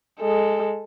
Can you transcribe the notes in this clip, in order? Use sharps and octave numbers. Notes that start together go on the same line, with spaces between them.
G#3 A4